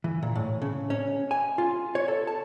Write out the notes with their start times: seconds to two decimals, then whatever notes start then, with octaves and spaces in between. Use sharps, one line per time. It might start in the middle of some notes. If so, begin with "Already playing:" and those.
0.04 E3
0.23 A#2
0.35 A2
0.62 C#3
0.90 C#4
1.31 G#5
1.58 F4
1.95 C#5
2.08 A4
2.27 A5